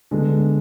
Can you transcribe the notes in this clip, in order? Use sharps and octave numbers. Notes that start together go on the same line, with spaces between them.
D3 G#3 B3